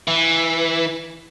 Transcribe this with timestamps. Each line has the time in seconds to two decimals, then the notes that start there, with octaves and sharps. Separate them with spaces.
0.08 E3